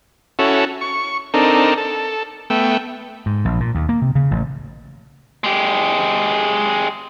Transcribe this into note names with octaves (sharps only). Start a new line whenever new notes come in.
C#4 E4 F#4 A4
C#6
C4 D4 D#4 A4 A#4
A4
A3 B3 E5 G5
G#2
A#1
A#2
D#2
A#3
C3
C#3
A1
G#3 G4